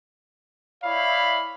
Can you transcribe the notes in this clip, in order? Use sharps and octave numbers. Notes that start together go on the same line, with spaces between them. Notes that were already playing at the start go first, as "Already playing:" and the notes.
E4 C#5 D5 E5 F5 B5